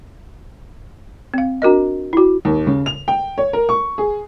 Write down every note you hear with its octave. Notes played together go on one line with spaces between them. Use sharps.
C4 F5
D4 F#4 A#4 D#5
E4 F#4
D#2
C#3
F7
G5
C#5
A#4
C#6
G#4